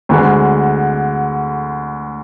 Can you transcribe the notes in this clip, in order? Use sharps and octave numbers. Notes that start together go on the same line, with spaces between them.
D2 D3 G#3